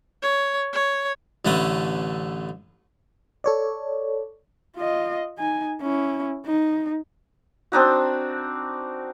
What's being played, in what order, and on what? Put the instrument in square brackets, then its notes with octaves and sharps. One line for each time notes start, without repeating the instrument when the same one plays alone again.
[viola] C#5
C#5
[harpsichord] A1 D3 A3 C#4 B4 D#6
[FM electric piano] A4 C#5 D5
[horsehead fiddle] F4 D#5
D#4 G#5
C#4 E4
D#4
[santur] C4 D4 D#4 F#4